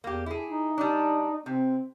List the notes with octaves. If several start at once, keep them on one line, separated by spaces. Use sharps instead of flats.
E2 A#3 G4
E4 G#4
D#4
G3 D4
C3 C4